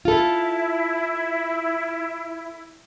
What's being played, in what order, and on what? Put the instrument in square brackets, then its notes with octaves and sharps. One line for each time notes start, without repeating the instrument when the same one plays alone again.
[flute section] E4 [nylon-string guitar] F4 A4